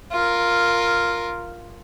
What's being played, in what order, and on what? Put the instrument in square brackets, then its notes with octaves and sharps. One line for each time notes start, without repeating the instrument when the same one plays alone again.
[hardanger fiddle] F4 A#4